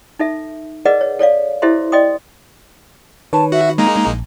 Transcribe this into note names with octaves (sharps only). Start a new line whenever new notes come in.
D#4 A4 E5
G#4 A#4 B4 D5 D#5 F#5
C#5
A4 C#5 D5 F5
E4 G4 A4 C5 E5 C6
D5 D#5 G5 C6 D#6
D#3 B4 C#5 A5
F#4 E5
G#3 A#3 D#4 A#5
A#1